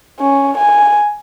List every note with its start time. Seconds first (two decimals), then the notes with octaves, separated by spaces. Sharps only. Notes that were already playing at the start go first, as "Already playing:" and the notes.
0.20 C#4
0.58 G#5